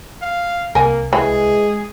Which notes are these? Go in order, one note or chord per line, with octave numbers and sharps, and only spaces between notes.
F5
C2 A#3 A#4 G#5
E3 G#3 G#4